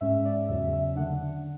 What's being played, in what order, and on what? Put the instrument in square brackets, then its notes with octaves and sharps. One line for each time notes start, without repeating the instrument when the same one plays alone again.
[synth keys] G#2 G#3 C#4 E5
D5
E2 C#3 F#3 C#4 E5
E5
D3 A3 D4 F#5